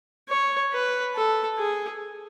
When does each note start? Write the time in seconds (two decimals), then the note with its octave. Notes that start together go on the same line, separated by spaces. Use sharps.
0.29 C#5
0.73 B4
1.15 A4
1.58 G#4